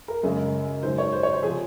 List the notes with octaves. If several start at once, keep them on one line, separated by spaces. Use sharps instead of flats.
A#4
F#2 C#3 G#3 G#4
G#2 D#3 F#3 C5
C#5
C5
C#5
C5
C3 F3 G#4